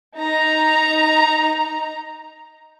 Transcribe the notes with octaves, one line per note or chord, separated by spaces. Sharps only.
D#4 A#5